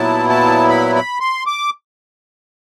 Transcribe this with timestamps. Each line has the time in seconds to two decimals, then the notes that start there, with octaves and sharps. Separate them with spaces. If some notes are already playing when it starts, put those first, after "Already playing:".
Already playing: A#2 F#3 B3 E4 A5
0.29 A5
0.69 B5
0.95 B5
1.20 C6
1.47 D6